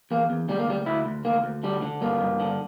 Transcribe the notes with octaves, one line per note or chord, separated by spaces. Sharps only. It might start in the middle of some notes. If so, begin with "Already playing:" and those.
E2 A#3
E2
D2 G3
A#3
D2 G3
D2 E4
D2
D2 A#3
D2
D3 G3
D3
G2 A#3
G2
D3